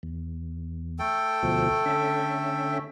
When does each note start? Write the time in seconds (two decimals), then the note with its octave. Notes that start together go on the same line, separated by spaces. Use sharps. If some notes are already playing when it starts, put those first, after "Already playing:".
0.03 E2
0.99 A3 A4 G5
1.43 D2 B2 F3
1.85 D3 C#4 E5